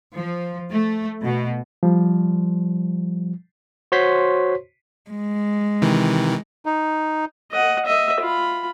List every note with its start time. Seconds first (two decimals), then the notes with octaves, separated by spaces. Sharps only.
0.16 F3
0.71 A3
1.24 B2
1.83 F3 G3
3.92 F#4 C5 C#5 C6 B6
5.11 G#3
5.82 C3 D#3 E3
6.66 D#4
7.52 D#5 F#5
7.86 D#5 E5
8.20 F4 B5